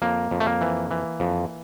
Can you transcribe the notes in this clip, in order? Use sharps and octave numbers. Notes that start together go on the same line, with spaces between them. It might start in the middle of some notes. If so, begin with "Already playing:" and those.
F2 A#3
F2
A3
A#3
E3
E3
F2